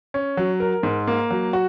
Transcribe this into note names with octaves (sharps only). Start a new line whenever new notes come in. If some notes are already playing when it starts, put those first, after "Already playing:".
C#4
F#3
A#4
G#2
A#3
F#3
F#4